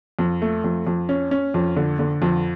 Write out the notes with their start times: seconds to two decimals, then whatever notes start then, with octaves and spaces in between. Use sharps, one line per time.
0.19 F2
0.42 A3
0.64 F2
0.87 F2
1.09 C#4
1.31 C#4
1.54 F2
1.76 D3
1.99 D3
2.22 F2